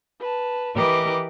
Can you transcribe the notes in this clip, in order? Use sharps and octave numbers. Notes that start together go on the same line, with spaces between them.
B4 A5
E3 G4 A#4 B4 D#5 D6